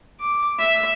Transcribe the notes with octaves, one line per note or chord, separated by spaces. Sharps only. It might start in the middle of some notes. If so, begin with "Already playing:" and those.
D6
E5